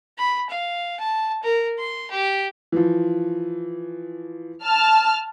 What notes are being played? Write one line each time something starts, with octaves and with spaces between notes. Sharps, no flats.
B5
F5
A5
A#4
C6
G4
E3 F3
A5 F6